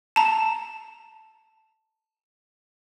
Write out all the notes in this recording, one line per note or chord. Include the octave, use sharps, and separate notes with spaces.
A5 A#5